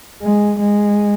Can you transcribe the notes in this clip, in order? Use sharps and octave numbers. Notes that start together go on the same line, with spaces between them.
G#3
G#3